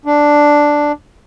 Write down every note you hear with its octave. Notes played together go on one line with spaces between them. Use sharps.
D4